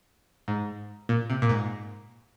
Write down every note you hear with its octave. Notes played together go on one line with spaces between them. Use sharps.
G#2
A#2
C3
A#2
G#2